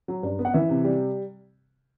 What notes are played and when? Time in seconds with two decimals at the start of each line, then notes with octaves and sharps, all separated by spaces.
0.08 F#3
0.23 G2
0.39 B3
0.45 F#5
0.54 E3 E5
0.70 C3
0.84 G3